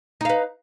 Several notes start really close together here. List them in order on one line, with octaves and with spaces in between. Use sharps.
D#4 F5 B4